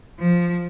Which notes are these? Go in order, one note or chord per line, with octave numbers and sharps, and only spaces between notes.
F3